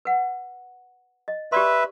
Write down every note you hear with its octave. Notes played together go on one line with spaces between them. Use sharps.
B4 F#5
D#5
G4 B4 D5 E5 C6